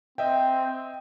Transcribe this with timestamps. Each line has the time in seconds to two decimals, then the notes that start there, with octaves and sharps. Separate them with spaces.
0.18 C4 D#5 E5 G5